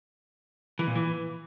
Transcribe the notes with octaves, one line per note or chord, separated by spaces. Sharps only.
E3
A#2
E3